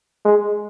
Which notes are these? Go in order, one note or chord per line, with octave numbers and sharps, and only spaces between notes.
G#3